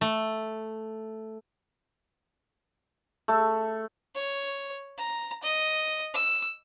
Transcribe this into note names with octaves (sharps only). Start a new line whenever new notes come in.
A3
A3
C#5
A#5
D#5
E6